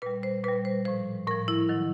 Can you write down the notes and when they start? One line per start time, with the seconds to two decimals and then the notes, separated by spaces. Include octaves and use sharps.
0.02 A#2 G3 B4
0.23 C5
0.44 A#2 G3 B4
0.65 C5
0.85 A2 F3 C5
1.27 A2 F3 A#4
1.48 E4
1.69 D#3 F#3